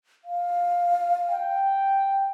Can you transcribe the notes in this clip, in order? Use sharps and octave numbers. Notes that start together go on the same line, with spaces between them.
F5
G5